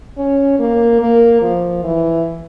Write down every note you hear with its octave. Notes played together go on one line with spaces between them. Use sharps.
C#4
A#3
A#3
F3
E3